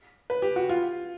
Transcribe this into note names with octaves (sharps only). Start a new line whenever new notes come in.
B4
G4
F#4
F4